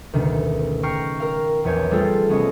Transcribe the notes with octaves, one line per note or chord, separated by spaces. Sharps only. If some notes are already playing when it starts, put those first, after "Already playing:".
F#1 D2 B2 D#3
G5 A#5 C#6 F6 A#6 C7
A#4 F5
A#1 E2 B4 C#5 G#5 G6
G3 A3 C4 F4 G#4 A4
C2 B3 C#4 D#5 C#6